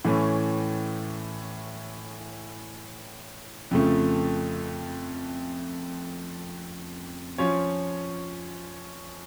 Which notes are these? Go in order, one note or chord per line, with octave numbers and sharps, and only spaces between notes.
A2 E3 A3 C#4
F2 C#3 F3 A3
F3 C#4 F4 C#5